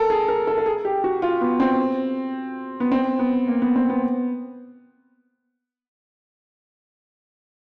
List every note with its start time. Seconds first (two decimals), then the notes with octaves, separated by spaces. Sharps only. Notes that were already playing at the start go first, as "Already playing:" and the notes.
Already playing: A4 A#4
0.10 G#4
0.28 A#4
0.47 A4
0.58 A4
0.66 G#4
0.85 G4
1.04 F#4
1.22 F4
1.41 B3
1.60 C4
2.80 B3
2.92 C4
3.19 B3
3.48 A#3
3.62 B3
3.76 C4
3.90 B3